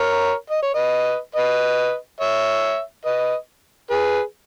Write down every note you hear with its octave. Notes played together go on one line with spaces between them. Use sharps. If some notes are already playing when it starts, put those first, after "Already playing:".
Already playing: A#4 C#5
D#5
C#5
B4 D#5
B4 D#5
C#5 E5
B4 D#5
G#4 B4